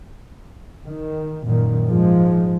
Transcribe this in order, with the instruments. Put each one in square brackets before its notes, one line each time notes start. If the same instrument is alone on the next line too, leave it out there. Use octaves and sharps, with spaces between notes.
[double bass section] D#3
F#2 A#2 D#3
G#2 F3 G#3